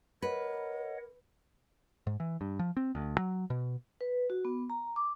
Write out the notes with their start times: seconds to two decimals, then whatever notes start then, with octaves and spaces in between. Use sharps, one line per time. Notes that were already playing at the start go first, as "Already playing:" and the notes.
0.22 A#4 B4 C#5 D#5 F#5
2.07 G#2
2.20 E3
2.41 G2
2.59 F3
2.77 C4
2.95 D2
3.18 F#3
3.50 B2
4.01 B4
4.30 F#4
4.45 B3
4.70 A#5
4.96 D6